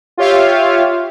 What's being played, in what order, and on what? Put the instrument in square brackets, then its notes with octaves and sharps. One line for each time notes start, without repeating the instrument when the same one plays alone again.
[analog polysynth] F4 G4 C#5 E5 F5